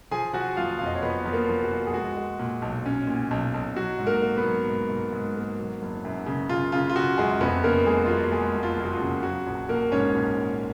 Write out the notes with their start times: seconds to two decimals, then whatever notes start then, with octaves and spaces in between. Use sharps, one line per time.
0.11 F3 G#4 G#5
0.34 F3 F#4 F#5
0.57 F#1 F4 F5
0.79 F2 F5
0.86 D#5
0.95 C#5
1.02 F3 B3 B4
1.25 F3
1.33 A#3 A#4
1.49 F3
1.64 F#4
1.72 F3
1.87 G#4
1.93 G#3 F#4
2.17 G#3
2.39 A#2
2.62 B1
2.86 C#4
3.07 A#2
3.31 B1
3.54 B1
3.76 F#3 F#4
3.98 G#2
4.07 A#3 A#4
4.21 A#3
4.37 B3 B4
4.44 F#3
4.67 G#2
4.90 G#2
5.12 G#2
5.36 A#3
5.59 F#3
5.82 F#1
6.05 F#2
6.26 C#3
6.49 C#3 F4
6.72 C#3 F4
6.90 F4
6.95 C#3 F#4
7.18 F#2 G#3 G#4
7.40 F2 B3 B4
7.64 C#3 A#3 A#4
7.87 F#1 G#3 G#4
8.05 F4
8.09 F#1 F#4
8.32 F#1 G#3 G#4
8.55 F#1
8.63 F4
8.78 F#1
8.84 F#4
8.92 F4
9.01 C#3
9.23 F#3 F#4
9.46 A#1
9.68 A#1 A#3 A#4
9.92 G#2 C#4 C#5
10.14 A#1
10.37 A#1